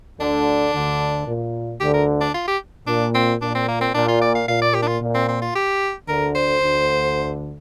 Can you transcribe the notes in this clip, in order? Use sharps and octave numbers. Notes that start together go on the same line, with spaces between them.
D2 D3 D4
D2 D3
A#2
D2 D3 G4
A#4
D4
F4
G4
A#2 D4
C4
A#2 D4
C4
A#3
C4
A#2 D4
F4
D5
F5
A#2 F5
D5
G4
D4
F4
A#2
C4
C4
F4
G4
D2 D3 A#4
C5
D2 D3